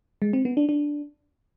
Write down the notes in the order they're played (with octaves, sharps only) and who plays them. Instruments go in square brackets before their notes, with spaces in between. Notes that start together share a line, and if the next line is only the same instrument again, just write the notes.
[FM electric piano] G#3
C4
B3
D4
D4